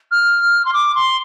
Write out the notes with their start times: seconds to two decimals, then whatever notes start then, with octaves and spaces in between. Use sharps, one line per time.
0.11 F6
0.65 C6
0.73 D6
0.94 C6